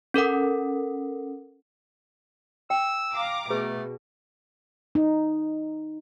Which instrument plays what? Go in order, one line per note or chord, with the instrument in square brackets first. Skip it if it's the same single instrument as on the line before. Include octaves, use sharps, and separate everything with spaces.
[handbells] C#4 A4 A#4 F#5
[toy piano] G5 [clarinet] E6
[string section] F5 A#5 D6
[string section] B2 [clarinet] A3 [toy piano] G#4 B4
[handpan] D#4